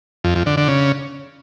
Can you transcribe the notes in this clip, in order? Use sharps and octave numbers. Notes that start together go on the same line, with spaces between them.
F2
F2
D3
D3
C#3